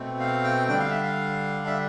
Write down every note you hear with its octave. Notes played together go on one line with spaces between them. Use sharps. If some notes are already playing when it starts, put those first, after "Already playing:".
Already playing: B2 A3 C4
F5
G5
D3 G3 D4 G5
F5
E5
F5
E5